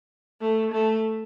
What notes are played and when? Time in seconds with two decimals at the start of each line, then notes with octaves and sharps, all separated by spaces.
0.41 A3
0.72 A3